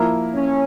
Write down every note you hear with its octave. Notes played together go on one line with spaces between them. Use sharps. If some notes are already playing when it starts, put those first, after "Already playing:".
Already playing: F3 A#3 E4 A#4
C#4